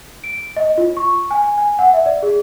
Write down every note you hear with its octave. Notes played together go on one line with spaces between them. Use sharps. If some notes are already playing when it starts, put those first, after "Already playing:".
D7
D#5
F4
C#6
G#5
G#5
F#5
E5
D5
G#4